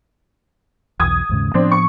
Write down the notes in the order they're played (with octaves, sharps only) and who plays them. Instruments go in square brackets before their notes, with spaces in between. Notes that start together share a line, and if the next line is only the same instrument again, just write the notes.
[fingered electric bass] B1 E2 [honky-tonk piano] D#6 G#6
[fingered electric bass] D#2 G#2 C#3
[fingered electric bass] A2 F3 B3 [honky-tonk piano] C4 D4
[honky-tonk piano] C#6